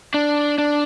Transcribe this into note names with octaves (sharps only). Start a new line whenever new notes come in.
D4
D4